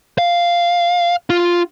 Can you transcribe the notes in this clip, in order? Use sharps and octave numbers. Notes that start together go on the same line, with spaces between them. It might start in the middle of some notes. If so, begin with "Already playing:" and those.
F5
F4